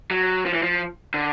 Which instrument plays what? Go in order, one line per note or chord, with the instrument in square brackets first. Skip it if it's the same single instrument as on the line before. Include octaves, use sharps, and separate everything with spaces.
[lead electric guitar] F#3
F3
E3
F3
D3